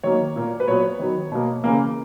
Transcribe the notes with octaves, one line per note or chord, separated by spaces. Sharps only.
D#3 F#3 A#3 C#5
A#2 A#3
B4
A#2 F#3 B3 C#5
D#3 F#3 B3
B2 A#3
C#3 E3 A#3